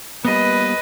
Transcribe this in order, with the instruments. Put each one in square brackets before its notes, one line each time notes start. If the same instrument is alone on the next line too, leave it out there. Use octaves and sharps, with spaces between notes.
[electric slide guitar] G3 A#3 B3 [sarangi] B4 [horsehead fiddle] D#5